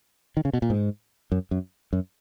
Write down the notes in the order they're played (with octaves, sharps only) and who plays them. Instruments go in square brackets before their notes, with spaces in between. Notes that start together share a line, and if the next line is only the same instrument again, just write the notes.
[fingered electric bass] D#3
C#3
B2
A#2
G#2
F#2
F#2
F#2